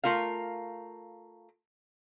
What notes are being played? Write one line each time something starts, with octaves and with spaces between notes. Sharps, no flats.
A3 F4 A#4 F5